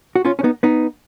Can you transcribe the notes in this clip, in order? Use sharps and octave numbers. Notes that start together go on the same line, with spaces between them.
F#4
C#4 F4
C#4
B3 D#4
B3 D#4